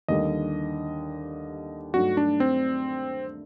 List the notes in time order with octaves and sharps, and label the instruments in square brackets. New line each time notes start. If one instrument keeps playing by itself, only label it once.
[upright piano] D#2 D3 G3 [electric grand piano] D#5
[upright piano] G2 F#3 A3 D#4 [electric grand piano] F#4
[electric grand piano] D4
C4